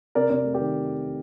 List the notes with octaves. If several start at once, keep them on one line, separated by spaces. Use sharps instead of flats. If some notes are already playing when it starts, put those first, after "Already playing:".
C3 A#4 D5
C3 A#4 D5
A3
G4 A#4
D#3